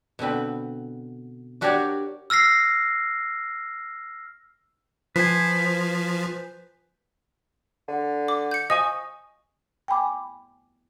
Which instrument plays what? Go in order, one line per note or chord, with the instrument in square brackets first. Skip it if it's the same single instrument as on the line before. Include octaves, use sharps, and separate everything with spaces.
[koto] B2 D3 C4 B4
D4 F#4 G4 A#4 C#5 D5
[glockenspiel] E6 F6 A#6 C7
[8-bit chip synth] F3 [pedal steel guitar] B4 C5 G#5
[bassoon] D3
[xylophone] D6
G6 C#7
[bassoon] F3 [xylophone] D#5 G#5 C#6 [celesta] D#6
[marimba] G5 G#5 B5 D6